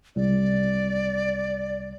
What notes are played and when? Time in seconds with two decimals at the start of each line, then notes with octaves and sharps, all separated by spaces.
0.16 C2 D5